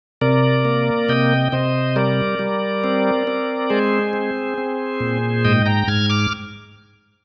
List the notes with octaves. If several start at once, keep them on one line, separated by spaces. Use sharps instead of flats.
C3 A#4 D5
A#3
C3 D#5 G5
C3 C5 D#5
G3 A#4 D5
G3
C4
C4
G#3 G#4 C5
C4
C4
A#2
G#2 D#5 G5
G5 A#5
G#2 F6 G#6
D6 F6